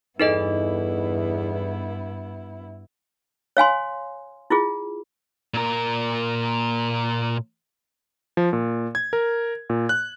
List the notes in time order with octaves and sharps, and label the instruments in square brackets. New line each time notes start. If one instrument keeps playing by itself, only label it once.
[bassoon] E2 [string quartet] G2 B3 E4 [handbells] D#4 A4 D#5
[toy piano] C#5 F5 G#5 C6
E4 F4 G#4
[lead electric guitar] A#2 A#4
[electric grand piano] F3
A#2
G#6
A#4
A#2
F#6